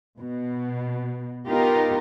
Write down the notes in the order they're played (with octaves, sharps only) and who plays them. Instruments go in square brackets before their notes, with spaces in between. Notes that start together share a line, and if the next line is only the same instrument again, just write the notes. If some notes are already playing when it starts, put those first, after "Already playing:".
[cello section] B2
B3 D#4 F4 G4 A#4